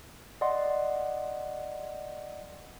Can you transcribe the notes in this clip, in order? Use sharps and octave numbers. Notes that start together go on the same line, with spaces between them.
D5 D#5 F#5 C6